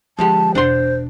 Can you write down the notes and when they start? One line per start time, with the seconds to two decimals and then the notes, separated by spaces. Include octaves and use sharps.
0.19 D3 F3 G#3 G4 A5
0.55 E1 D4 C5 F#5 C6